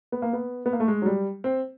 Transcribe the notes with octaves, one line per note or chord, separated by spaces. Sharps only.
B3
A#3
B3
B3
A#3
A3
G#3
F#3
G3
C4